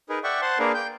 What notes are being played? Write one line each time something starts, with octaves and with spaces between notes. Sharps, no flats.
D#4 G#4 A#4 B4
D5 E5 F#5 G5 C#6
C5 F#5 A5 C6
A#3 D4 G#4 A#4 B4 F5
G5 G6